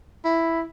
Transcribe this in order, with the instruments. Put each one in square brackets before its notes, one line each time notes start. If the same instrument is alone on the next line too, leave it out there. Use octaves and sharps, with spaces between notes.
[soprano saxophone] E4